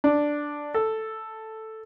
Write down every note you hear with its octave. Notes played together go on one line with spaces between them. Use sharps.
D4
A4